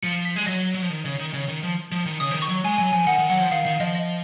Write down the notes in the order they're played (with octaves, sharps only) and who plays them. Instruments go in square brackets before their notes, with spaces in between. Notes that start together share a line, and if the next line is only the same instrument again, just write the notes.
[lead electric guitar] F3 [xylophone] C#7
[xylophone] B6
[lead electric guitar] G#3
[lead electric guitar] F#3 [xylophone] A#6
[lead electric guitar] F#3
F3
D#3
C#3
D#3
C#3
D#3
F3
F3
D#3
[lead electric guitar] C#3 [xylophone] D#6
[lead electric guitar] F3
D#3
[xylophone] C#6
[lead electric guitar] F#3
[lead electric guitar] G#3 [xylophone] G#5
[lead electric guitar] F#3 [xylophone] G#5
[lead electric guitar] F3 [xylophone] G#5
[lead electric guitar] D#3 [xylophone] F#5
[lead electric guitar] D#3
[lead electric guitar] F#3 [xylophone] F#5
[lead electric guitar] F3
[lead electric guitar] D#3 [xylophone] F5
[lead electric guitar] D#3 [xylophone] F5
[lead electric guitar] F3 [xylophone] D#5
[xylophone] D#5